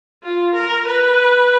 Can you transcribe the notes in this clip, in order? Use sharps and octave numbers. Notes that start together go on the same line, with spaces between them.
F4
A#4
B4